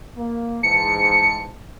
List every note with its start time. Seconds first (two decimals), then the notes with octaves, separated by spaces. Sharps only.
0.17 A#3
0.63 G#2 E3 A5 C#7